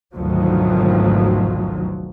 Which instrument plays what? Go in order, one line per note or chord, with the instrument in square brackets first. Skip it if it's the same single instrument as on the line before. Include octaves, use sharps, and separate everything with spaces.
[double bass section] G#1 D2 B2 D#3 F3 F#3